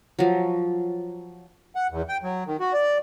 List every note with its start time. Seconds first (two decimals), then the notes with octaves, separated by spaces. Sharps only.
0.19 F3 F#3
1.75 F#5
1.90 E2
2.09 G5
2.23 F#3
2.47 D#3
2.60 F#4
2.73 D5